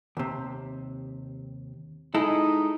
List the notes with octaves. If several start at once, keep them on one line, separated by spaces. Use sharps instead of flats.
D#2 C3
G#3 D#4 E4 A4